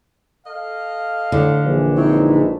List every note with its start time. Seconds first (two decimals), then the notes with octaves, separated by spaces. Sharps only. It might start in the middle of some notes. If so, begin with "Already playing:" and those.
0.47 A4 D#5 F5
1.32 A2 D3
1.65 A#1 E3
1.96 E3 C4 D#4 E4 C#5
2.28 C#3 G#3 A3